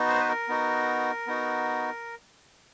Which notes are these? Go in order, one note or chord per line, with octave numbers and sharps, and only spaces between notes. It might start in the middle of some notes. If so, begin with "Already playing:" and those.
Already playing: B3 D#4 F#4
C5
B4
A#4
B3 D#4 F#4
B3 D#4 F#4